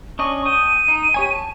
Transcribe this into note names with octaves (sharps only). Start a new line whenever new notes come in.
C#4 D4 D#5 C#6
G5 A5 D#6 D#7
D#4
G4 C#5 G#5
A5